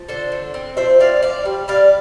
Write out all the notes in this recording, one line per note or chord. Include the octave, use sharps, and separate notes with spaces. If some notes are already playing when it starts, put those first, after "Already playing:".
Already playing: F3
D3 A4 C5
D3
C4
F3 C5 E5
C4 D5 F5
F3 D5 F5
G3
G3 D5 F5